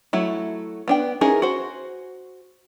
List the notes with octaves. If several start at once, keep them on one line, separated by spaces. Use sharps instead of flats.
F#3 A3 E4
B3 D4 G5
C#4 D#4 E4 G#4 A#4
F#4 C5